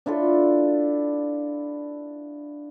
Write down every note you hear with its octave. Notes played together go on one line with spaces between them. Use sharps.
D4 E4 F4 A4